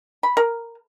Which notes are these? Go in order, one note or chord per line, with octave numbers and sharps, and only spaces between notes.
B5
A#4